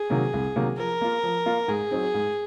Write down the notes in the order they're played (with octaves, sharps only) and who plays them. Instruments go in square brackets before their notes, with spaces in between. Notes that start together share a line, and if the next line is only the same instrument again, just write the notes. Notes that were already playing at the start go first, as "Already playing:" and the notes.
Already playing: [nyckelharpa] G#4
[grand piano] C3 D#3 F#3 A#3
C2
C3 D#3 F#3 A#3
[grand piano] F3 [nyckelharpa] A#4
[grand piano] A#3 F4
F3
A#3 F4
[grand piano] G#2 [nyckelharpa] G#4
[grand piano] F#3 C4 D#4
G#2